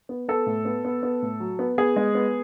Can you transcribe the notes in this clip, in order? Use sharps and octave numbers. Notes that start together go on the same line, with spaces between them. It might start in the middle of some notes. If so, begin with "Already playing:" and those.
B3
B3 A4
A2
B3
B3
B3
A2
F#3
B3
B3 G#4
G#3
B3